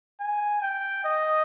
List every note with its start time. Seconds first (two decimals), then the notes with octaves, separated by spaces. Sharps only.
0.20 G#5
0.62 G5
1.05 D#5